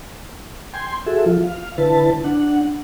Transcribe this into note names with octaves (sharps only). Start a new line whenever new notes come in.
G5 G#5 C6
F#4 G#4 A4 E5
F3 F4
F5
D3 E4 B4 A5
D4 F#5